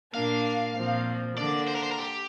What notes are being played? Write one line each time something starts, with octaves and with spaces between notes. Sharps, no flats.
A#2 A#3 D4 F5
A#2 F3 C4
D3 A#3 D4 D5
C5
A#4
C5
A#4
G4